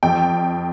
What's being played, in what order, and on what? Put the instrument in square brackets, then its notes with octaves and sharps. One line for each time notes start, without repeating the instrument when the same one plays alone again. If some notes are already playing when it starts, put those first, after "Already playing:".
[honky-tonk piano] F2 G5